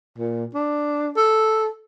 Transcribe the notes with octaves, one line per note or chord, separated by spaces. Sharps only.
A#2
D4
A4